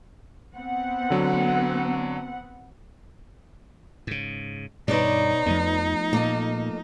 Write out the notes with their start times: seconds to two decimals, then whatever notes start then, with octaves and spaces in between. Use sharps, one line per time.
0.56 B3 C4 F#5
1.10 D3 F#3
4.07 G#2 C#3
4.88 G2 B2 D#3 D#4 B4 C#5 D5
5.46 F2 F3 A3 B3
6.13 A#2 A#3 A4 D#5